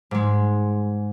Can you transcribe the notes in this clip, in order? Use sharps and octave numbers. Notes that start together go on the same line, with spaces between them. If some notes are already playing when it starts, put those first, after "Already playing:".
G#2 G#3